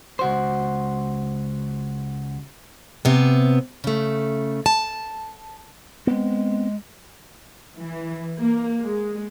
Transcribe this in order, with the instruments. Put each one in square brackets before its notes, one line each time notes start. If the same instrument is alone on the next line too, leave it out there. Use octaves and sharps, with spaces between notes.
[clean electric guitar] C#2 F#4 C5
[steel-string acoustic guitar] C3 B3
C#3 A3
A5
[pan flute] G#3 [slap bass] B3 C4
[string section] E3
A#3
G#3